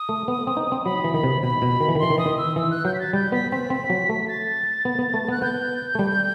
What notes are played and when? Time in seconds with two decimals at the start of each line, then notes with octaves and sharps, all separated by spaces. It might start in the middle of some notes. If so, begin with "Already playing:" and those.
Already playing: D#6
0.09 A3
0.28 B3
0.47 C4
0.57 D#4
0.72 C4
0.85 F#3 B5
1.04 E3
1.14 D#3 B5
1.23 C3
1.42 B2 B5
1.62 B2
1.81 D#3
1.89 E3
1.95 D#3
2.00 E3 C6
2.10 D#3
2.18 E3 D#6
2.26 D#3
2.38 E6
2.56 E3 E6
2.71 F#6
2.85 F#3 G6
2.94 B6
3.00 A6
3.13 G3 G6
3.32 B3 B6
3.52 C4 B6
3.70 C4
3.90 F#3
4.09 A3
4.28 A6
4.85 B3
4.99 B3
5.14 A3
5.28 B3 F#6
5.42 B3 G6
5.95 A3
5.99 G3